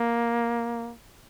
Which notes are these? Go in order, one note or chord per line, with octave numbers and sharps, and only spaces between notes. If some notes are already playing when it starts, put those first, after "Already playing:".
Already playing: A#3